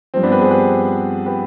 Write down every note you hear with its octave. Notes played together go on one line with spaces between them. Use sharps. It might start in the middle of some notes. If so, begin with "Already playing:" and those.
G2 F3 C4
B3 D4
G4 B4
G#4 C5
G4 B4
G4 B4